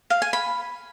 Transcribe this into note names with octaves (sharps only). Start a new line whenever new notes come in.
F5
G#5
B5